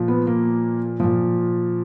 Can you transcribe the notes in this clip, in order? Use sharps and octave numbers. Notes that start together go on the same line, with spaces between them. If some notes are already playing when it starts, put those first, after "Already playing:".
Already playing: A#2 F3
B3
A#3
A#2 F3